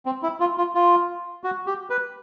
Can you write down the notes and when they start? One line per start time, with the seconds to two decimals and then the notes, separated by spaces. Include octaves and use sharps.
0.06 C4
0.23 E4
0.40 F4
0.58 F4
0.75 F4
1.44 F#4
1.67 G4
1.90 B4